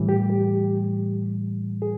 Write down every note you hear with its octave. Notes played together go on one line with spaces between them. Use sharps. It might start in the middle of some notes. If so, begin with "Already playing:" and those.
Already playing: A2 E3 G3
G4
G4
G#4